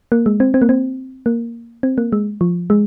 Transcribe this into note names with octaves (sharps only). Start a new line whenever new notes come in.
A#3
G#3
C4
C4
A#3
C4
A#3
C4
A#3
G#3
F3
G#3